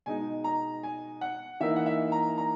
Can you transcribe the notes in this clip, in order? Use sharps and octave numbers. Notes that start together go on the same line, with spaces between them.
B2 G#3 D#4 G#5
A#5
G#5
F#5
E3 A#3 D#4 E5
F#5
E5
A#5
A#5